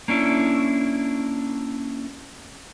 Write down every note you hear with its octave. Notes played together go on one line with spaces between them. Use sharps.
A#3 C#4 D4 E4